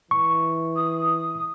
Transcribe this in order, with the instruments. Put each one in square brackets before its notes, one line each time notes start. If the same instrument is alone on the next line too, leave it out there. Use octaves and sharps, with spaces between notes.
[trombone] E3 [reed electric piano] C#6
[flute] D#6